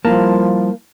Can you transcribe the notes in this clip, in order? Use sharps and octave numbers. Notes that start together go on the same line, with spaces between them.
F3 G3 A#3 E4 A5